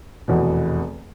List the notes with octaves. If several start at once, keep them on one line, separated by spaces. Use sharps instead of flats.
F1 E2 B2